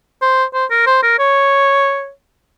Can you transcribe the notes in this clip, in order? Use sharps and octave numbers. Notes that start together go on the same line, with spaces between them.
C5
C5
A#4
C5
A#4
C#5